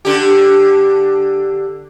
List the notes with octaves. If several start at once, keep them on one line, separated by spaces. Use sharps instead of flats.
D3 G4